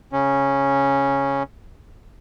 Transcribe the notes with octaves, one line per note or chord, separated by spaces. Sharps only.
C#3 C#4